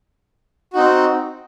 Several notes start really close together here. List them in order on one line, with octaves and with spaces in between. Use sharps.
F#4 D#4 C4